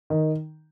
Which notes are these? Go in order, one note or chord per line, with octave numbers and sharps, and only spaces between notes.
D#3